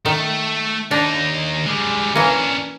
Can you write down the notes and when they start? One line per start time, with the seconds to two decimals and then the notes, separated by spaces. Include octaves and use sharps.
0.06 D#3 A3
0.91 D#2 D4 D#4
1.66 G3 G#3
2.15 E3 A#3 C#4 D4